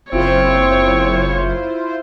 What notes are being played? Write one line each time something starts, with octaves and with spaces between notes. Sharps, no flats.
F#1 C4 E4 F4 C5 C#5